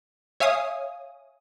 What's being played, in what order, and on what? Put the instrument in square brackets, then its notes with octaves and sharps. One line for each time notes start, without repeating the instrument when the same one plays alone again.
[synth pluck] C#5 E5 F5 G#5 D#6